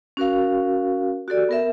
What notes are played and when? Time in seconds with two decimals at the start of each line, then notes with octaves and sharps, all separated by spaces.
0.17 C#4 F#4 A#4 F5
1.28 F#4 G4 A4 D5
1.49 B3 A#4 E5